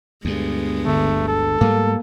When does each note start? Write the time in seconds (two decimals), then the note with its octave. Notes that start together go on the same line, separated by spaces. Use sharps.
0.25 D2 G2 G#3 B3
0.86 G1 A3
1.28 A4
1.61 G#2 G3 A3 A#3